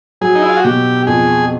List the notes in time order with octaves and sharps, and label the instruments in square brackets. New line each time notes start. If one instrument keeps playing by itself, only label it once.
[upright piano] F#3 [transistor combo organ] G#4
[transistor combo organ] D#4
E4
F4
F#4
[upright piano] B2 [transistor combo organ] G4
[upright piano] F2 [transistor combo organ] G#4